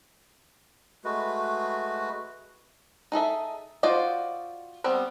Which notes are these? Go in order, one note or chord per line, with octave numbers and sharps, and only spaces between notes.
G#3 A3 F#4 B4
D#4 G#4 A4 E5
F4 F#4 C5 D5 D#5
G3 B3 C4